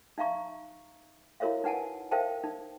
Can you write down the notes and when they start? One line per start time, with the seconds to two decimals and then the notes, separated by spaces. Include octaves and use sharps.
0.18 D#4 E5 F5 A#5 C#6
1.40 E4 F#4 A#4 C#5 E5 F5
1.64 D#4 B4 F#5 G#5 A5
2.11 A#4 C5 E5 F5 G5 A5
2.44 D#4